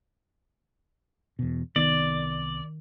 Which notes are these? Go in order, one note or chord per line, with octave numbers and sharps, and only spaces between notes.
E2 B2
C2 D#3 B3 D5